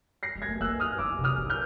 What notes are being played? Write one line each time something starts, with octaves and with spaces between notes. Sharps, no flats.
A#6 C7
G#3
G#6 A#6
A3
A#3 E6 F#6
D#6 F6
F3 D6 E6
C3
D#6 F6
D3
F6 G6